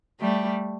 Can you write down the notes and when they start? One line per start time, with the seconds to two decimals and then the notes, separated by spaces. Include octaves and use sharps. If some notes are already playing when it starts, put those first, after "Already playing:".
0.20 G3 A3